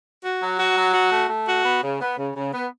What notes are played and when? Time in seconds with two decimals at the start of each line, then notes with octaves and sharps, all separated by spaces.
0.23 F#4
0.41 F#3
0.58 F#4
0.76 F#3
0.93 F#4
1.12 A3
1.29 A3
1.46 F#4
1.64 B3
1.82 C#3
2.00 B3
2.16 C#3
2.34 C#3
2.52 B3